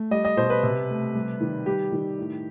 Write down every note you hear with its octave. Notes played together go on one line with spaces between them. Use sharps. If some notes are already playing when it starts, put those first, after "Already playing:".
Already playing: A3
G3 D#5
D#5
B2 C5
B4
C3
A3
G3
D#3
G3 G4
D#3
A2